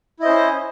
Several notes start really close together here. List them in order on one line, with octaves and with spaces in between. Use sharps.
E4 D#5 C5 C#4